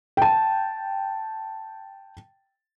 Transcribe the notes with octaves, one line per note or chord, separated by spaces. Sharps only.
G5 A5